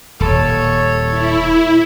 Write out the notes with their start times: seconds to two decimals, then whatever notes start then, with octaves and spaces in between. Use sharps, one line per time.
0.20 D#1 A4 C#5
1.10 E4